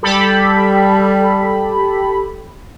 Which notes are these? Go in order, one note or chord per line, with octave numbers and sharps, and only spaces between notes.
G3 G4 A4 B5